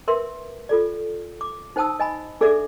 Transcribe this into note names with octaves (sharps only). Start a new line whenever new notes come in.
A#4 B4 E5 C6
F4 A4 D5
D6
D#4 C5 G5 A5 D#6 E6
D#5 G#5 B5
D4 G#4 A4 D5 E5 D6